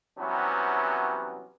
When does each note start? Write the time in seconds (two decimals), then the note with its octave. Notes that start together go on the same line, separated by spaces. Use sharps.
0.18 C3 E3 F#3 G3 B3 C#4